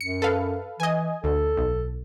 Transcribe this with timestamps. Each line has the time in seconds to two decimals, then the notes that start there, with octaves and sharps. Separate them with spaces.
0.01 F#2 C#7
0.22 A4 B4 F5
0.80 E3 D#5 G#5
1.24 D2 A4
1.57 B1